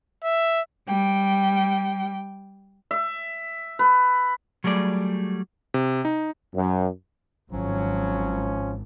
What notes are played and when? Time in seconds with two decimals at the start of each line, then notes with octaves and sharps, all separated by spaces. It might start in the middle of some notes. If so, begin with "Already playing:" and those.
0.24 E5
0.87 G3 G5
2.91 E5
3.79 B4
4.64 F#3 G3 A3 G#4 D5
5.74 C3
6.05 D#4
6.54 F#2
7.51 G#1 F3 F#3 C#4